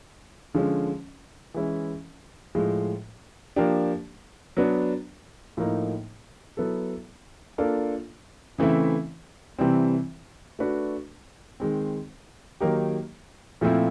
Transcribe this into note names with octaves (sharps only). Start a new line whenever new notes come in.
D3 F3 G#3 C#4
E3 G#3 C#4 E4
A2 F3 G#3
F3 A#3 D4 G4
F#3 B3 D4
A2 F3 A#3 D#4
F#3 B3 E4 A4
A#3 D4 F4 A4
C#3 E3 A3 C4 E4
C3 E3 G3 C4
A3 D4 F#4 B4
D#3 G#3 C4
D#3 F#3 A#3 D#4 G4
A#2 F3 A3 C4 E4